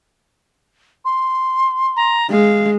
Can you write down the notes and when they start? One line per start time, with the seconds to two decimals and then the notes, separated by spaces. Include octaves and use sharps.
1.05 C6
1.96 A#5
2.31 G#3 F5